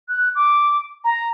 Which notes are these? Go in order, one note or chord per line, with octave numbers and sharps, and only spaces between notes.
F#6
D6
A#5